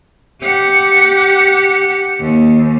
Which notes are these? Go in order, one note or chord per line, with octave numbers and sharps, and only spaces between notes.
G4 F#5
D#2